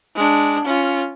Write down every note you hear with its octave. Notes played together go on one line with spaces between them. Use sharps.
G#3 D4
C#4 F4